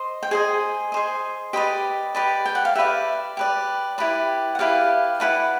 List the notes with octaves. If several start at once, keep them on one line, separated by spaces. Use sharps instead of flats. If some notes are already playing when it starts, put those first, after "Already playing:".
Already playing: C5 D#5
G5
G#4 C5 D#5 G#5
G#4 C5 D#5
G4 B4 D5 D#5
G4 B4 D5
G5
F#5
F5
G4 B4 D5 E5
G4 B4 D5
E4 G4 B4 D5
F#5
E4 G4 B4 D5 F5
E4 G4 B4 D5 F#5